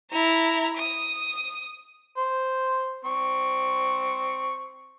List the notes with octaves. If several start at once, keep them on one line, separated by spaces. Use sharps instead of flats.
E4 A#5
D#6
C5
C4 C#6